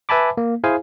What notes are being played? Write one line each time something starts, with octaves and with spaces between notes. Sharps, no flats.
B4 E5 G#5 A5 B5 D6
A#3
E4 G#4 C5 F5 G#5